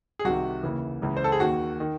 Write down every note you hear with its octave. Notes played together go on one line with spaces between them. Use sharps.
G#4
C2 C3 D#3 F#4
D#2 C#3 E3
C#2 C#3 E3
C5
A4
G#4
D#2 D#3 F#4
D#3